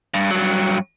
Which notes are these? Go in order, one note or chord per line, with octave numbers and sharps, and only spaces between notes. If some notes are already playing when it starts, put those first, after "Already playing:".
G2
G2 F#3